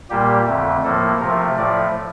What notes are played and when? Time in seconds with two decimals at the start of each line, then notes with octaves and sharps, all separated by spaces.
0.10 A#2 G3 A#3 G4
0.47 F2 D3 A3
0.84 A2 F3 A#3 A4
1.20 C3 F3 A3 A#4
1.57 A2 F3 A3 D5